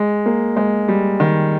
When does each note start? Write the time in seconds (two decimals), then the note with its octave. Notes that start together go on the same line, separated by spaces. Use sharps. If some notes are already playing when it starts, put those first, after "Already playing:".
Already playing: G#3
0.26 A#3
0.57 G#3
0.88 G3
1.20 D#3